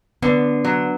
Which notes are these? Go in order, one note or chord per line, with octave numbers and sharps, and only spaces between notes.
D3 B3
F#3